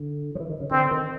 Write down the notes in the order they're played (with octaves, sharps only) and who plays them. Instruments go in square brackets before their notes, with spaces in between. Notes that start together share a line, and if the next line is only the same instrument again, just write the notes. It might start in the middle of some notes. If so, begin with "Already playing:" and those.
Already playing: [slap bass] D3
F3
E3
D#3
C#3
[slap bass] D3 [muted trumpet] C4
[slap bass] D#3